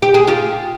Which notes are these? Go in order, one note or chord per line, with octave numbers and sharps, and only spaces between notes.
G4
G#4
F4 G4